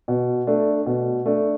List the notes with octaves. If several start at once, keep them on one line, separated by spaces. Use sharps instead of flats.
B2
A3 D4
B2
A3 D4